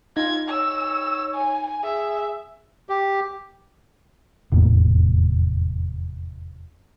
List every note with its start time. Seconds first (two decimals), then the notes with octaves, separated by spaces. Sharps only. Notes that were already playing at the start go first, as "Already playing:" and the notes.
0.17 D#4 F4 G#6
0.49 C#5 E6
1.35 G#5
1.84 G#4 E5
2.89 G4
4.52 F1 E2 A2 A#3